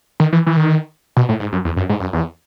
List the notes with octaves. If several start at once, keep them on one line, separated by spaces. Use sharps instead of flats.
D#3
E3
E3
D#3
B2
A2
G#2
F#2
E2
F#2
G#2
F#2
E2